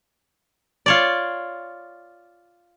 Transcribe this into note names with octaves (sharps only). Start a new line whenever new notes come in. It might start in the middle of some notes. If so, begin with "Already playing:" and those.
F4 C#5 D5